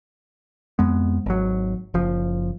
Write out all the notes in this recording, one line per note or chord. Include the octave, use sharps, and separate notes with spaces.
F2 G#3 B3
G#1 F#3
F#1 F3